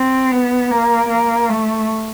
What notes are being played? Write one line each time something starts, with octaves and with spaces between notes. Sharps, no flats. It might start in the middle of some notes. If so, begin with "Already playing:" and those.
Already playing: C4
B3
A#3
A#3
A3